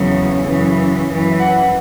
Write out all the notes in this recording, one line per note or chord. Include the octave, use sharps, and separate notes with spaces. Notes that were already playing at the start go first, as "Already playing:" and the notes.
Already playing: E2 C#3 F#3
F#2 C#3 E3
F#2 E3
F#5